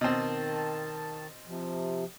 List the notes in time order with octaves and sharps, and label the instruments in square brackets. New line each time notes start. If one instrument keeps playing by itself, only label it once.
[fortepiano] B2 C4 [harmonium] D#3 A5
[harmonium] C3 F3